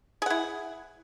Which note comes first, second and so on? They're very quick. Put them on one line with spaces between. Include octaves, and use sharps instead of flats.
G#4 F#5 E4